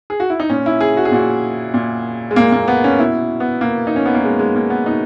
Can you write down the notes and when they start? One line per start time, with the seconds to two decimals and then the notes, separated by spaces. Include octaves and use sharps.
0.10 G#4
0.20 F#4
0.30 E4
0.40 D#4
0.49 A#2 C#4
0.66 E4
0.81 G#4
0.97 F#4
1.05 G#4
1.12 A#2 F#4
1.74 A#2
2.31 G#3
2.36 A#2 A#3
2.52 A#3
2.68 B3
2.84 C#4
2.98 B2 E4
3.40 B3
3.61 B2 A#3
3.87 D#4
3.96 C#4
4.06 B3
4.14 A#3
4.23 B2 G#3
4.39 G#3
4.55 A#3
4.70 B3
4.86 B2 D#4